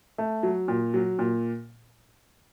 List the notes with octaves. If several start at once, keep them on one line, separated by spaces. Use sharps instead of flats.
A3
F#3
A#2
F#3
A#2